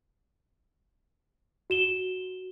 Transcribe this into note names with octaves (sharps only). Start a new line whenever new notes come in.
F#4 E7 G7